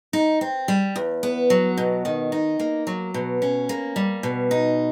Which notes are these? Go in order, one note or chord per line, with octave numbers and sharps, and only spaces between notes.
D#4
C4
G3
E2
B3
F#3
B2
D#3
D#4
A#3
F#3
B2
C#4
A#3
G3
B2
D#4